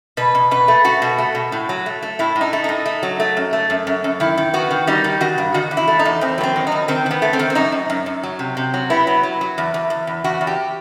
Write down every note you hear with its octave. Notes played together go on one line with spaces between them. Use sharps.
B2 B4
B2
B2 B4
A3
A3 F#4
B2
A3
B2
A2
F#3
A3
A3
A2 E4
A2
D#4
A3
A2 D#4
A3
F#3
A3
F#2
A3
F#2
F#2
F#2
D#3 E4
D#3
B3 F#4
D#3
G3 D#4
D#3
D#3 F#4
G2
D#3 F#4
E2
E4
A3
D#4
E2
E2 C4
F#3 B3
C4
D#3
E2 D#4
D#3 C4
D#3 B3
A3
C4
D#3
C4
F#2 D#4
F#2
F#2
F#2
F#3
C3
C3
F#3
B3 E4
F#3
F#3
F#3
E2
E2
E2
E2
E2 F#4
E2
G4